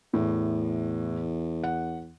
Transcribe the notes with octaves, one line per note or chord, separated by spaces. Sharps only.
E2 A2
F#5